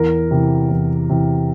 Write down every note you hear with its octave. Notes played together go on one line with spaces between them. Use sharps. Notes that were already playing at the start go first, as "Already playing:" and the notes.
Already playing: E2 A#4
C3 E3
E2
C3 E3